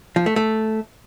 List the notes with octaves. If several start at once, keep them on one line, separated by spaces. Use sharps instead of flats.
F3
A3
A3